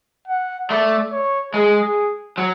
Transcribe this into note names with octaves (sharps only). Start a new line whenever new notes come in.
F#5
A3 D5
C#5
G#3 G#4
F#3